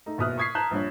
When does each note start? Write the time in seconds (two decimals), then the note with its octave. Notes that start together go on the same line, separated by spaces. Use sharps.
0.06 A3 D#4
0.18 F#1 B2 E5 D#6 F6 F#6
0.38 C#6 D#6 G#6 B6 C7
0.55 A5 A#5 F#6 G6 E7
0.71 A#1 G2 C#5